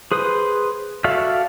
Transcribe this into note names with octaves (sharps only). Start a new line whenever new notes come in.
G#4 B4 C5 D#6
F#4 A4 D5 E5 F5